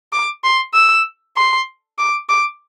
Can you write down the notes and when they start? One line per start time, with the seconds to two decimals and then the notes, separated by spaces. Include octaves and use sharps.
0.13 D6
0.44 C6
0.74 E6
1.37 C6
1.99 D6
2.29 D6